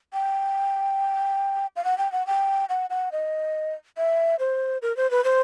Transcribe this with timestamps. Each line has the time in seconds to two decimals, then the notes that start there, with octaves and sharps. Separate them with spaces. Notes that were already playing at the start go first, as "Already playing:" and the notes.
0.13 G5
1.76 F5
1.85 F#5
1.98 G5
2.12 F#5
2.27 G5
2.69 F#5
2.90 F#5
3.12 D#5
3.97 E5
4.39 C5
4.82 A#4
4.97 C5
5.11 B4
5.24 C5